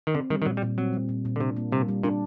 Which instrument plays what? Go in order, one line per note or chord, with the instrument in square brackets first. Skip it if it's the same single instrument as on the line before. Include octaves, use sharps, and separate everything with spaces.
[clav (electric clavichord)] D#3
[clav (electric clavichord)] D3 [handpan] C4
[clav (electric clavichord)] D#3 [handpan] G3
[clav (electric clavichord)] D#3
[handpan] A#2 [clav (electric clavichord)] F#3
[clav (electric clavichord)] G3
[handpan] A#2
[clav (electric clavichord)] F#3 [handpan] C4
[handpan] G3
A#2
A#2
[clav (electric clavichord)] D3
[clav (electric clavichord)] C3 [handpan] D4
[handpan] A#3
[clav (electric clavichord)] C3 [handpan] G3
[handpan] G3
[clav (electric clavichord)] A#2 [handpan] D4